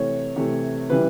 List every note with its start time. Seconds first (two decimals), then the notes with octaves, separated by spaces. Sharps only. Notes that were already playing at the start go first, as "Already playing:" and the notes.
Already playing: C3 E3 A3 C#5
0.36 C3 E3 A3
0.90 C#3 E3 G3 B4